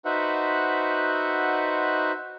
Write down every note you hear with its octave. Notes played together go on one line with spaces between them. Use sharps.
D#4 F#4 B4 C5 E5 F#5